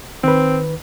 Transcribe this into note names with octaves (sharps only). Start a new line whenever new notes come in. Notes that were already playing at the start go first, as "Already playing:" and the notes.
D#3 C4 B4